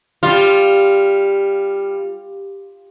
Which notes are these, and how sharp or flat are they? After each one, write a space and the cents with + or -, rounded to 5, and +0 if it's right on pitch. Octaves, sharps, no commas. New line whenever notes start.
G3 +10 F4 +0